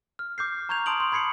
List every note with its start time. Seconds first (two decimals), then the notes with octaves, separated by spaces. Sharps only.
0.19 F6
0.38 D6 G6 C7
0.69 A#5 C#6 G6 G#6 F7
0.86 A5 C6 D#6 D7 F7 F#7
1.00 C6
1.12 B5 G#6 C7 C#7 F#7